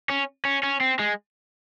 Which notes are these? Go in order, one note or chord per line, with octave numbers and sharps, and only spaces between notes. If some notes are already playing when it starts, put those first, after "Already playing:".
C#4
C#4
C#4
C4
G#3